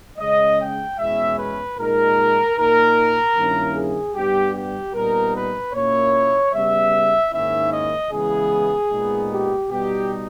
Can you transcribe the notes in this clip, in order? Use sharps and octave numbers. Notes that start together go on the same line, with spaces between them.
C#3 G#3 C#4 D#5
G5
E2 B2 G#3 C#4 E4 E5
B4
A#2 G#3 D#4 A#4
A#2 A#3 D#4 A#4
G2 D#3 A#3 C#4 E4
G#4
G2 G3 B3 G4
G4
A#2 G3 B3 D#4 A#4
B4
A#2 A#3 C#4 E4 C#5
C#3 G3 B3 E5
G#2 D#3 A#3 C#4 E4 E5
D#5
C#3 E3 G#3 B3 E4 G#4
A#2 G#3 B3 D#4
G4
B2 G3 B3 D#4 G4